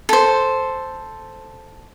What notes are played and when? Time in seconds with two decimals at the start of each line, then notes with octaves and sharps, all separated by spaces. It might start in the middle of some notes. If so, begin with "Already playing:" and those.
0.09 A4 C5